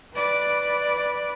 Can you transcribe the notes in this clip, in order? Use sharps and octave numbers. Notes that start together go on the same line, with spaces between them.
B4 D5